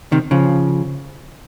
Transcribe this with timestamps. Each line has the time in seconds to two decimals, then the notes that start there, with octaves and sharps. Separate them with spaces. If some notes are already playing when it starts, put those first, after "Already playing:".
0.12 C3 D#3
0.31 C#3 F3